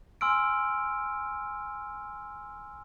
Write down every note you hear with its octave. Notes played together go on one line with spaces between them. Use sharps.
G#5 C6 E6 F6 D7